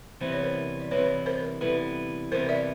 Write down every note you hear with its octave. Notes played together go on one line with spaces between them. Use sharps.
C3 E3 G3 B3 E4 C5
C#5
A#4 C5
D5
C3 E3 G3 B3 E4 B4 C#5
A#4 C5
C3 E3 G3 B3 E4 A4 B4
C3 E3 G3 B3 E4 A#4 C5
D5 E5